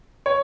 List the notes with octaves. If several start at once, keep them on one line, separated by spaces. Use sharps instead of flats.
C#5